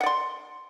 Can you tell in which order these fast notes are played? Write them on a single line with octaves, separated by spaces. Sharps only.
F#5 D5 C6